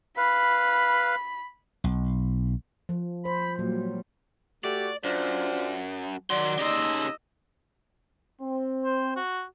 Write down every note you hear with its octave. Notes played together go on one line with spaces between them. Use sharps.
B4 F5 B5
B1
F3
C5 B5
A#2 F#3 G3
A3 F#4 G4 D5
F#2 D4 F4 C5
D#3 F#3 D5 C6
C#3 D#4 G4 D#5 C6 E6
C4
C5
F#4